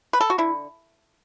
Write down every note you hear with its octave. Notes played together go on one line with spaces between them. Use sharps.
B4
A4
F#4
D3 E4